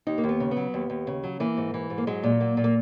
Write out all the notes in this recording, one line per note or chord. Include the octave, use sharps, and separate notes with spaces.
D#2 D#4
A#3
D#2
B3
C#3
B3
F#3
D#2
D#2
C#3
F#3
E3 A#3
G#2
E3
G#2
A#3
F#3 G#3
A#2
F#3 A#3
A#2
A#3